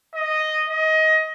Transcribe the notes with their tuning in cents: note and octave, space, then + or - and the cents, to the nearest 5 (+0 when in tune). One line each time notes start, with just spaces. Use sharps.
D#5 -5
D#5 +20